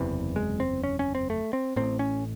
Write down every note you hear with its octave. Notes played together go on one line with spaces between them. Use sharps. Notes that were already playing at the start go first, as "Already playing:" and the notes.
Already playing: F#1 E2 C3 E3
G#3
C4
C#4
C#4
C4
A3
C4
A1 A2 C4
C#4